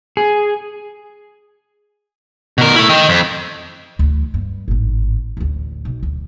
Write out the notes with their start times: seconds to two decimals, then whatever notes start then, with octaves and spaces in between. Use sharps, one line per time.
0.17 G#4
2.58 B2 A#4
2.76 A3 E4
2.89 D#5 G5
3.09 F2
3.99 D2 E3
4.34 G2
4.68 G#1 A2
5.37 A1 D2
5.85 B1
6.03 D2